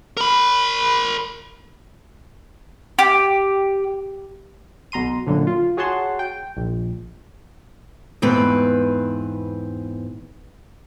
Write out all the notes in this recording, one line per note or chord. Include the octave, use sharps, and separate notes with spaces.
A#4 B5
G4
B1 B2 A#5 C6 D#7
F#2 A#2 D3 F3
F4
F#4 G#4 C#5 F#5 A5 C6
G5
A#1
E2 G#2 C4 B4